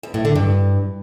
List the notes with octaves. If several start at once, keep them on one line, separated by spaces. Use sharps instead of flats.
E2
A2
D3
G2